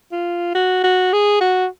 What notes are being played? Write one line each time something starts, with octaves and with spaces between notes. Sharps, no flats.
F4
F#4
F#4
G#4
F#4